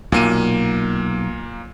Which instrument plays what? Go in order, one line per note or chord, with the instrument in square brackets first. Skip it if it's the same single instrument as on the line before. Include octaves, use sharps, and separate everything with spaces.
[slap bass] B1 [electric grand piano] A#2 A#3 D#7